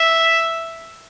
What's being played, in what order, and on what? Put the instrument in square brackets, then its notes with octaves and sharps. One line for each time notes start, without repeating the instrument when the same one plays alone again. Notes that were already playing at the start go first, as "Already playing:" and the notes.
Already playing: [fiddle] E5